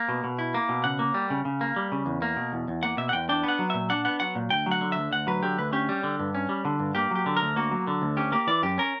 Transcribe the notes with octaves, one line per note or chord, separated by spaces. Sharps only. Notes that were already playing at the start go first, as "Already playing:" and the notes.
Already playing: A#3
B2
B2
E4
A#3
B2
C#3 F#5
A#3
G3
C#3
C#3
A#3
G3
C#3
E2
A#3
B2
E2
E2
A#3 F#5
B2 E5
F#5
E2 G5
D4 G5
B3
F#5
F#3
A#2 E5
D4 F#5
B3 F#5
F#3 F#5
A#2
D2 G5
F#3
F#5
D3
D2 E5
D2 F#5
F#3 B4
D3 G4
D2 B4
C#4 G4
G3
D3
G2
C#4
G3
D3
G2
A#3 G4
F#3 G4
D3
A#4
D2
A#3 F#4
F#3
D3
D2
C#4 G4
A#3 G4
E3 D5
F#2 G4
C#4 A#4